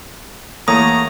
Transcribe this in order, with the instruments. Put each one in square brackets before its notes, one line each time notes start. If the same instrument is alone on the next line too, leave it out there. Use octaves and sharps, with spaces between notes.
[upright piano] E2 A3 C#5 [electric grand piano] A#3 [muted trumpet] A#5 [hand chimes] D#6